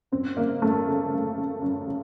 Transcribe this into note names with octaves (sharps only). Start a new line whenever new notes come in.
F#2 C4
C#3 A#3
F#2 A3
C#3
F#2
C#3
F#2
C#3